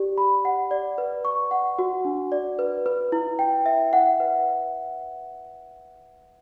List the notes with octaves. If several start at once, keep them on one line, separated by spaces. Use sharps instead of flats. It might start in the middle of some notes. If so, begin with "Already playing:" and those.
Already playing: G4 D5
B5
F#5
D5
B4
C#6
F#5
F#4
D4
D5
B4
B4
E4
G5
E5
F#5
B4